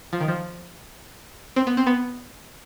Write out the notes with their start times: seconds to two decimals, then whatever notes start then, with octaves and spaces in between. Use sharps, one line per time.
0.13 F3
0.20 D#3
0.28 F3
1.56 C4
1.67 B3
1.77 C4
1.87 B3